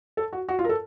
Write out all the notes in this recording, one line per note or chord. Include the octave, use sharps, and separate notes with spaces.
A4
F#4
F#4
F4
A#4
A4